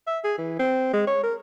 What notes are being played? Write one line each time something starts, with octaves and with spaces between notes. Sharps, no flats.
E5
G#4
E3
C4
G#3
C#5
A#4